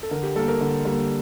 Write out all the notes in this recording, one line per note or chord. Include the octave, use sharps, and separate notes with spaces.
A4
D3 A#4
G4
G3 A#3 A4
A#4
D3
G3 A#3